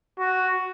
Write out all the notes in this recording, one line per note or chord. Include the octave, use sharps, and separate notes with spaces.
F#4